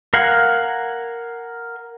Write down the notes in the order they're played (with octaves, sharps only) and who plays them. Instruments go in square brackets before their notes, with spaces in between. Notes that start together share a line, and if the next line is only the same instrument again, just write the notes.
[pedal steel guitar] A#4 F5 F#5 G#5